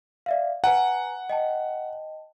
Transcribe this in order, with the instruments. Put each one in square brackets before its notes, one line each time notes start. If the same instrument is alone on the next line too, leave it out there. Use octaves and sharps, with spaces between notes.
[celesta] D5 E5 F5
[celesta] B4 G#5 A#5 [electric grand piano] F#5
[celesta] D#5 G5 A5